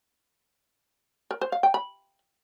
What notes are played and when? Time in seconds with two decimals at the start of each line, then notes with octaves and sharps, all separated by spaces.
1.31 A#4
1.41 C5
1.52 F5
1.63 G5
1.74 B5